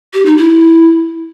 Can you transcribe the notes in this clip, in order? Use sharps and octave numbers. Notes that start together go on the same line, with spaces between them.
G4
D#4
E4